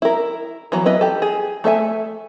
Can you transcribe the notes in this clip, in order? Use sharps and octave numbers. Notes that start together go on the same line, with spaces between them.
E4 A#4
E3 F#3 B3
E4 B4 D#5
G4 A4
G#4
A3 A4 E5 G#5